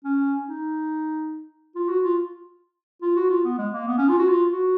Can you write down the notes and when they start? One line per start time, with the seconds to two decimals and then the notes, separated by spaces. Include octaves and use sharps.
0.04 C#4
0.47 D#4
1.75 F4
1.88 F#4
2.03 F4
3.02 F4
3.16 F#4
3.30 F4
3.45 B3
3.58 G#3
3.73 A#3
3.87 B3
3.98 C#4
4.09 F4
4.19 F#4
4.29 F4
4.51 F#4